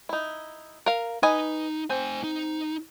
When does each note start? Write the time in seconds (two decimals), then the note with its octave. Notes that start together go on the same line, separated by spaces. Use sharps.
0.09 D#4 E4
0.86 A#4 F5
1.23 D#4 B4 D#5 G#5
1.90 C4 C5 G#5
2.24 D#4